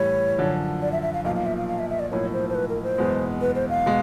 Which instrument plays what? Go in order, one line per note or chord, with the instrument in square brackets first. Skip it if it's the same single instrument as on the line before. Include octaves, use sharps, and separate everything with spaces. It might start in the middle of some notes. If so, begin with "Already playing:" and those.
Already playing: [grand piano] A2 E3 G3 [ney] C#5
[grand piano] F#2 D3 F3
[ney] D5
E5
E5
F5
[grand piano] B1 A#2 F3 [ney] F5
[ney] F5
E5
F5
F5
E5
E5
D5
[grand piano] B1 A2 F3 A#3 [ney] C#5
[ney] C5
C5
B4
A#4
C5
[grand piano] F#1 E2 B2 G#3 B3
[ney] B4
C5
F5
[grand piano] B2 G#3